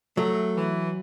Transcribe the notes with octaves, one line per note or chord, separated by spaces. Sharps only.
F#3 A3
E3